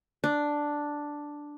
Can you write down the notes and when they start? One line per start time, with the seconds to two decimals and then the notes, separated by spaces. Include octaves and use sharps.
0.24 D4